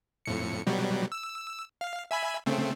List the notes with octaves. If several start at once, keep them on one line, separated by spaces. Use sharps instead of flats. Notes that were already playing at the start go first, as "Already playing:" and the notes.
F2 A2 C#7
B2 F#3 G3
E6
F5
E5 G#5 B5
C#3 A3 C4